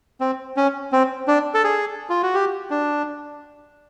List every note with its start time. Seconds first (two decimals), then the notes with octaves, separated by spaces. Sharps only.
0.21 C4
0.57 C#4
0.92 C4
1.28 D4
1.54 A4
1.64 G#4
2.10 F4
2.23 F#4
2.34 G4
2.70 D4